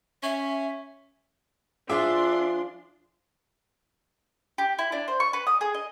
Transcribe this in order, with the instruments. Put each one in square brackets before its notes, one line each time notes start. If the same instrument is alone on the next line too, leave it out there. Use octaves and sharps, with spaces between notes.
[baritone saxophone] C#4 [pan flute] E5
[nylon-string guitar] F3 F4 G#4 [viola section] D4 C6 [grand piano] E5 D6
[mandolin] G4
E4
D4
C5
C#6
B4
D#6
G#4
D#5